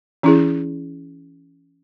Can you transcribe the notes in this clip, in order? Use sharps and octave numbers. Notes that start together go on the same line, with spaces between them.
E3 C#4 E4 G#4